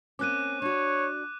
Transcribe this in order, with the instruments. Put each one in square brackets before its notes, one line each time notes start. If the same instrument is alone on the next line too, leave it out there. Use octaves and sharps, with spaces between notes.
[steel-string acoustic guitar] A#3 C4 C#4 [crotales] D6 F#6 D#7
[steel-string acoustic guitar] D4 F#4 [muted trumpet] C#5